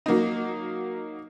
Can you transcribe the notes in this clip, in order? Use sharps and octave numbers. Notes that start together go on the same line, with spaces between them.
F#3 A#3 D#4